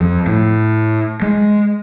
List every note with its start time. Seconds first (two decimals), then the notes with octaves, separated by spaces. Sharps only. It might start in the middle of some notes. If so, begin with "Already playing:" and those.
0.01 F2
0.27 A2
1.22 G#3